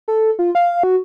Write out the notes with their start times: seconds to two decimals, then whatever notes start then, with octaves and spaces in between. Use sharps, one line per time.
0.08 A4
0.39 F4
0.55 F5
0.83 F#4